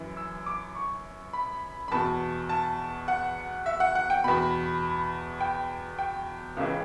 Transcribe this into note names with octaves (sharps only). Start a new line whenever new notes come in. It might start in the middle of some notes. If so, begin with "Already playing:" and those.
Already playing: F#2 E3
E6
D6
C#6
B5
B5
E2 B2 A5
A5
F#5
E5
F#5
F#5
G5
E2 B2 B5
G5
G5
C#2 C#3 E3